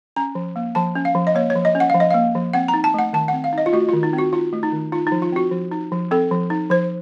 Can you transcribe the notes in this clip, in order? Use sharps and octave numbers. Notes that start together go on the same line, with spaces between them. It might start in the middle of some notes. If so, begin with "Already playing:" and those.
C#4 A#5
F3
A#3
F3 A5
C#4
F5
F3
D#5
A#3 C#5
C#5
F3
D#5
C#4
F#5
F3 F5
D#5
A#3 F5
F3
C4 F#5
A#5
D#4
A5
A3 F#5
D#3 A5
F#5
C4
F5
D#4 D#5
F4
A3 F#4
F4
D#3
D#4
C4
F#4
D#4 F4
A3
D#4
D#3
D#4 F4
D#4
F3
F4
C4 F#4
F3
D#4
F3
C4 A4
F3
D#4
F3 C5